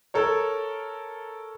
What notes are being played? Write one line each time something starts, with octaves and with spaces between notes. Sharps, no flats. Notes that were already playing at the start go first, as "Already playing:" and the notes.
A4 A#4 C#5